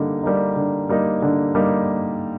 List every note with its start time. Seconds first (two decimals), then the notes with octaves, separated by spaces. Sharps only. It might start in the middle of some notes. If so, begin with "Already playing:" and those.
Already playing: D3 G3 A#3 D#4
0.23 G3 A#3 D#4
0.56 D3
0.89 G3 A#3 D#4
1.22 D3
1.55 G3 A#3 D#4